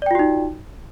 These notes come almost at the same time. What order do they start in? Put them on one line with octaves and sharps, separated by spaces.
D5 G5 F4 F#4 D#4